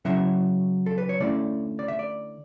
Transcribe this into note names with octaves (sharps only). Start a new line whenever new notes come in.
C#3 F#3 C#4 E4 E5
A4
B4
C#5
D3 A3 C#4 E4 D5
D5
E5
D5